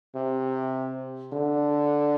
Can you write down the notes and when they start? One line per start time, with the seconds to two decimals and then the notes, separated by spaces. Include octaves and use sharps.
0.15 C3
1.33 D3